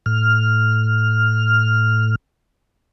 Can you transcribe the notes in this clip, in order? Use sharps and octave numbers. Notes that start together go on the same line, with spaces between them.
A2 F6